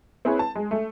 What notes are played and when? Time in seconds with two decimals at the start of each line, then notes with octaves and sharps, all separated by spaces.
0.25 C4 E4 G#4 B4 C#5
0.39 A5
0.55 G#3
0.71 A3